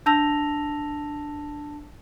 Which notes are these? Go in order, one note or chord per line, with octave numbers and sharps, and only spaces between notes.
D4 A5 E6 A#6 F7